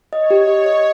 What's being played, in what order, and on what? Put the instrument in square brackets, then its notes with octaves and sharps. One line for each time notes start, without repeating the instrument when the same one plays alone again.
[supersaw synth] C#5 [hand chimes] D#5
[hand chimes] G4
D#5
D#5